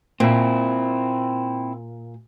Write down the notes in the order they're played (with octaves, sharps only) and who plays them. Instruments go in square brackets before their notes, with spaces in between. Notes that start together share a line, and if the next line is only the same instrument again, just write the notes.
[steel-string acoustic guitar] A#2 [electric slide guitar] C4 E4